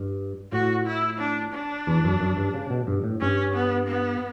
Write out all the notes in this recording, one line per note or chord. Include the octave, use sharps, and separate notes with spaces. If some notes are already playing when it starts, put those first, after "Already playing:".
Already playing: G2
A2 F#4
E4
D4
D4
E2
F#2
F#2
G2
C#3
B2
G2
A2
G2 C#4
B3
B3